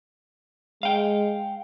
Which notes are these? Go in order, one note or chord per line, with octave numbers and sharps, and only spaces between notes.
G#3 F5 G5